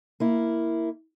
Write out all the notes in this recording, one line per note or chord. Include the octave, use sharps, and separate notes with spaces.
A#3 E4